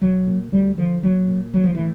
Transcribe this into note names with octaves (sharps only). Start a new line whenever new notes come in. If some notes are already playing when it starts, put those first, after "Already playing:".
B1 F#3
A#2
D2 G3
D3 F3
A#1 F#3
A#2
A#1 F#3
F3
A2 E3